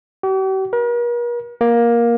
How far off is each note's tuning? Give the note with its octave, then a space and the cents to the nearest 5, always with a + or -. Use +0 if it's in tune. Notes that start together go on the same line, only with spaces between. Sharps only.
G4 -45
A#4 +45
A#3 +15